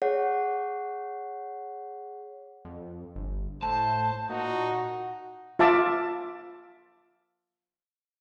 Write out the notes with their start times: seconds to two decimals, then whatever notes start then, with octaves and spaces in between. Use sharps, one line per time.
0.02 G#4 C#5 F#5
2.65 F2
3.16 G1
3.62 A2 C5 A5
4.30 A#2 D#4 F#4
5.59 F4 E5 A5 D6